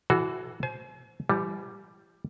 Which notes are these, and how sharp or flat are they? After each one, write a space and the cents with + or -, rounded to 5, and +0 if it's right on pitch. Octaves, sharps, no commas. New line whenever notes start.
E3 +5 F#4 +0 A4 -45
C5 +0 G#5 +45
E3 +45 G3 +0